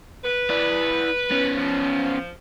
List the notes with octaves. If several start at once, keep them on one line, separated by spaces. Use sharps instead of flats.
B4
E4 D5
B3 C#4
F3